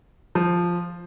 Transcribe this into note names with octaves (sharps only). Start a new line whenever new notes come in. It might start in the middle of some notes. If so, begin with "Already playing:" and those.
F3